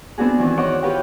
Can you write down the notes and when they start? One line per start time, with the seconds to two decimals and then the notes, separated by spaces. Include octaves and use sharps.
0.18 B3 C4 D4 F#4 G#4
0.38 D#3 E3 C4
0.57 C5 C#5 D#5 F#5 C#6 D6
0.83 F4 G4 B4 C#5 F#5 G5